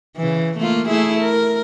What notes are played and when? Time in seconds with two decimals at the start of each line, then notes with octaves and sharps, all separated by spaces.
0.17 C#3 E3
0.58 A3 A#3 F4
0.88 A3 E4 G#4
1.21 A#4